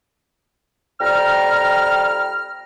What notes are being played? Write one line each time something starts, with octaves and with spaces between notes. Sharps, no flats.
F2 G3 G5 A#5 F6